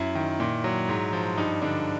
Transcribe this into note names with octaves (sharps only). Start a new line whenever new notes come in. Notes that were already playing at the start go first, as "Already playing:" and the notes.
Already playing: F#2 E4
D#3
A#2
F#3
G#2
F3
G2 D#4
D3 D4